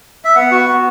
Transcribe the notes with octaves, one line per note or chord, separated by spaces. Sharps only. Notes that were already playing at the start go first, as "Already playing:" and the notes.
E5
B3 F#5
F#4
B3